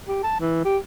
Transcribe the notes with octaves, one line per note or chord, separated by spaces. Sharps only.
G4
A5
E3
G4